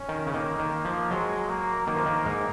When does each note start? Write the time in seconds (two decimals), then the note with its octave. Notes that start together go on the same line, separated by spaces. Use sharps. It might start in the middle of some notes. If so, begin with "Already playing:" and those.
Already playing: C#4
0.09 D#3
0.27 C#3
0.33 D#3 A#3
0.59 D#3
0.85 F3
1.11 F#3 G#3
1.49 A#3
1.87 D#3 A#3
1.96 F3
2.06 D#3
2.25 G#2